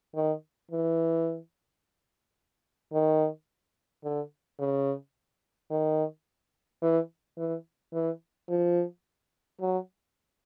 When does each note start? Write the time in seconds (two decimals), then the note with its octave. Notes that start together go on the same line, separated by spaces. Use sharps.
0.15 D#3
0.71 E3
2.93 D#3
4.04 D3
4.59 C#3
5.70 D#3
6.82 E3
7.38 E3
7.93 E3
8.49 F3
9.61 F#3